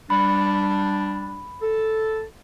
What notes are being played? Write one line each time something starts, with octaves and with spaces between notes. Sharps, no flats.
G3 D4 B5
A4